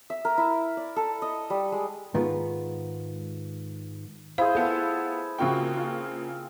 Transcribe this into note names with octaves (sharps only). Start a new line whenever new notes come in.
E5
A#4
E4
D5
A4
D#5
G3
G#3
G#2 D#3 G#3 B3 F4
E4 G#4 C5 F5
B3 F4 A4
C#3 A#3 C4 F4 F#4 G5
F4